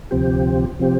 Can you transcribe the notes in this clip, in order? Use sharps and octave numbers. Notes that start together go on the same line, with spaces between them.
D2 C3 F3 C4 G4
C3 F3 C4 G4